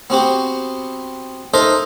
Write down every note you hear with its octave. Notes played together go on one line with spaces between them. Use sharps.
B3 C4 F#4 G4
D#4 A4 A#4 C5 D#5 E5